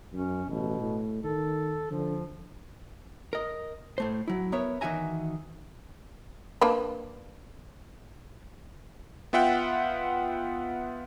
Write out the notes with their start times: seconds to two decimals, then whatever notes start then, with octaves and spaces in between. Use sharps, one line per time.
0.13 F#2 C#4
0.49 A1 B2
0.79 A2
1.23 D#3 A4
1.91 D3 F3
3.33 A#4 D#5
3.98 A2 A3 C5
4.28 F#3 E4
4.52 B3 A#4 C#5 E5
4.81 D#3 E3 F#4 E5 G#5 A#5
6.61 A#3 D4 B4
9.33 B3 F4 E5 F#5 G5